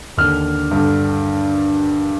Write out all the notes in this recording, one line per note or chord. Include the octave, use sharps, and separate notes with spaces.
D#2 D3 F6
G2 D3